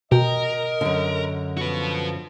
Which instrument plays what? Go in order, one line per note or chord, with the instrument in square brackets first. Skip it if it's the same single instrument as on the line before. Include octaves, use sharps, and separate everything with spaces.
[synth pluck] B2 [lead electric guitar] A#4 [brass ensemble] D#5 [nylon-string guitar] G5
[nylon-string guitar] F#2 D3
[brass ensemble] F3 [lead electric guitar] F#4 B4